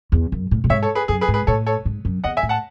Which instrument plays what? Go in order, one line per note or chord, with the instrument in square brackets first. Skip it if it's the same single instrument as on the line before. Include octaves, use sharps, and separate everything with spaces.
[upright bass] E2
F#2
A2
A2
[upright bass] G#2 [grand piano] C#5 E5
[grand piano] A4 C#5
G#4 B4
[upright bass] F#2 [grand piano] G#4
[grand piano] G#4 B4
[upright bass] G#2
[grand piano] G#4 B4
[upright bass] A2 [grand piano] A4 C#5
[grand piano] A4 C#5
[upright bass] G#2
F#2
[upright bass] E2 [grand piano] D#5 F#5
[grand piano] E5 G#5
[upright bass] A2
[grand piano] F#5 A5